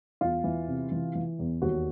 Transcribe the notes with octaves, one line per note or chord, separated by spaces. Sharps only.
E2 F4
E3
C3
E3
E3
E2
D#2 F#4